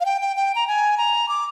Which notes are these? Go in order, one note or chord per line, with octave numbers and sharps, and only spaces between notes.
F5
G5
G5
G5
A#5
G#5
A#5
D6